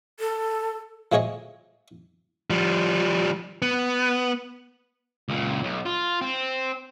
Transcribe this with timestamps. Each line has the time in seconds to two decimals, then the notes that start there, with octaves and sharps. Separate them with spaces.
0.20 A4
1.12 F3 A3 G#4 C#5 D#5
2.50 F3 G3
3.62 B3
5.29 C#2 A#2
5.63 B1
5.86 F4
6.22 C4